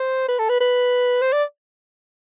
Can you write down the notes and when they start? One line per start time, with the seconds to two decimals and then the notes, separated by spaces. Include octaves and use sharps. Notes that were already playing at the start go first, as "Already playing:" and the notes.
Already playing: C5
0.28 B4
0.39 A4
0.50 B4
0.60 B4
1.22 C5
1.33 D5